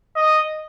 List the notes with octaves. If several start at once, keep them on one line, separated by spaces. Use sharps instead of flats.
D#5